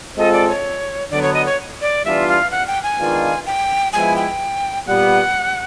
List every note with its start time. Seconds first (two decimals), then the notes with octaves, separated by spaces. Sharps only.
0.17 G#3 C4 F4 A4 D#5
0.33 D5
0.48 C#5
1.11 D3 F#3 B3 D5
1.22 C#5
1.34 D#5
1.46 C#5
1.81 D5
2.05 E3 G3 B3 D4 F4 E5
2.28 F5
2.51 F#5
2.67 G5
2.83 G#5
2.99 D#3 G#3 B3 D4 F4
3.46 G5
3.93 F3 G#3 B3 E4 G#5
4.16 G5
4.87 A#2 G3 B3 F#5